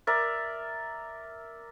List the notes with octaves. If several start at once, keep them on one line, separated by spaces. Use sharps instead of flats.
A#4 D5 E5